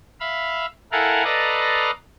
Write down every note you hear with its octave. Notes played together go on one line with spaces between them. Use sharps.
E5 F5 B5 E6
E4 A4 A#4 F5 F#5 G#5
A4 B4 D5 D#5 F5 A#5